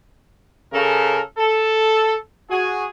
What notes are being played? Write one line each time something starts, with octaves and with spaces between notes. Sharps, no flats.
C#3 A4 A#4
A4
F#4 G#4